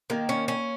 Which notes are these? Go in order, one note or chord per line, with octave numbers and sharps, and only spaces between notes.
D#3 A#3
C#4
C#4